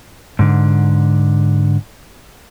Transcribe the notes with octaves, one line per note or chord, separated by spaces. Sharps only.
G#2 D3